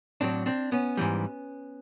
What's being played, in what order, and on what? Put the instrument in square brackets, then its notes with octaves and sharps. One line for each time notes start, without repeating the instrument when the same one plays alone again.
[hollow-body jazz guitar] A2 F#3 C4 D4
C4 D4
B3 C#4
G#2 E3 G3